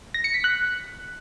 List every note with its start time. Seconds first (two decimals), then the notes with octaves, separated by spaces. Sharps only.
0.14 A#6
0.24 C#7
0.34 B6
0.44 F#6